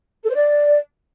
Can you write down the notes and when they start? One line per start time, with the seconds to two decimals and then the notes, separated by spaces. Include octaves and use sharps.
0.24 A4
0.29 C5
0.34 D5